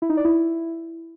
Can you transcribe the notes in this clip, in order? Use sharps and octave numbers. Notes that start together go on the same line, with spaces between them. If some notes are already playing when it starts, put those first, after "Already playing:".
E4
D#4
D5
E4